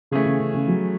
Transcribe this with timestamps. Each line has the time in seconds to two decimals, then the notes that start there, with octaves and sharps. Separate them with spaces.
0.11 C#3 E3 A3 C#4 G#4
0.26 C#3
0.40 C#3
0.54 C#3
0.68 F#3